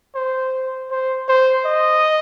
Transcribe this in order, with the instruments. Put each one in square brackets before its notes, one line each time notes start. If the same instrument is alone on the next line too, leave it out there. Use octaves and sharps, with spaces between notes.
[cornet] C5
C5
C5
D#5